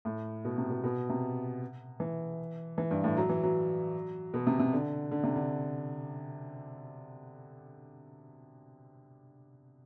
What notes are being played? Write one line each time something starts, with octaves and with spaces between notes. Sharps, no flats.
A2
B2
C3
B2
B2
C3
E3
E3
G2
A2
F#3
E3
F#3
B2
C3
C3
D3
D3
C3
D3